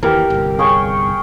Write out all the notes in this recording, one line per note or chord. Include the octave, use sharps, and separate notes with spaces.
D#2 E3 G4 A#4
G1 C2
G#4 C#5 G5